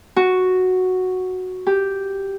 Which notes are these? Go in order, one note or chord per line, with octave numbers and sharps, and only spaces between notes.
F#4
G4